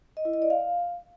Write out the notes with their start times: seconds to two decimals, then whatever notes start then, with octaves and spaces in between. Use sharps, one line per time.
0.17 D#5
0.25 E4
0.34 D#5
0.42 D5
0.50 F5